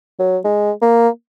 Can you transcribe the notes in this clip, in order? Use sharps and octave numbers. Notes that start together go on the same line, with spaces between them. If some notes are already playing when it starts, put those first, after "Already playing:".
F#3
G#3
A#3